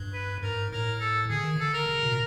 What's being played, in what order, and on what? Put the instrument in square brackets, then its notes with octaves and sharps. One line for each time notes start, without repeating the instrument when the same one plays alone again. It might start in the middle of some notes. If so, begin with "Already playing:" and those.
Already playing: [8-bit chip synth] G2
[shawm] B4
[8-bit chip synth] G#2 [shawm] A#4
[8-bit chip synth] A2 [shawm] A#4
[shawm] A4
[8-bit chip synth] D3 [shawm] G#4
[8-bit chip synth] D#3
[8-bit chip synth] D3 [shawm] A4
[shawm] A#4
[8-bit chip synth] C#3
B2
A#2